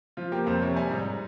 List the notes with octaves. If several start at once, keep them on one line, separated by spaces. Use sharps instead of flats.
F3 F4
A#3 G4
F2 C5
C3 C#5
G3 G#5
G#2